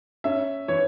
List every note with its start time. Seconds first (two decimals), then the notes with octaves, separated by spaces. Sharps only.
0.24 C#4 E5
0.68 E3 C#5